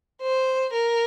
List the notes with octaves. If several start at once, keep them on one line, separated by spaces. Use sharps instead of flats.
C5
A#4